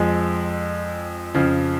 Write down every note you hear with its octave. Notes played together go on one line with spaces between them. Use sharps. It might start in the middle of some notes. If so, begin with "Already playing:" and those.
Already playing: F2 F3 G#3
F2 C#3 F3